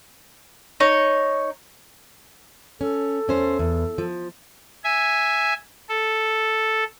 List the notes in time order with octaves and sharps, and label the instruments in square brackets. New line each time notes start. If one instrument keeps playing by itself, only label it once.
[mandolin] D#4 C#5
[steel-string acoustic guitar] C#4 [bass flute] A4
[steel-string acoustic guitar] E2 C#4 C5
E2
F3
[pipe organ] E5 G#5
A4